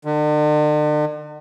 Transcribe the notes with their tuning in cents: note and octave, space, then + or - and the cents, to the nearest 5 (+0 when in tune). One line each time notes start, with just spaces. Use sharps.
D3 +45